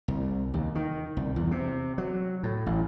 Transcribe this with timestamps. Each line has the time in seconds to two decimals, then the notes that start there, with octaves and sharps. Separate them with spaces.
0.08 C2
0.54 D#2
0.75 D#3
1.17 C2
1.36 E2
1.51 C3
1.98 F#3
2.43 A2
2.66 A1